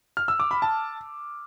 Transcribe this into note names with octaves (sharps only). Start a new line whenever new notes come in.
F6
E6
D6
B5
A5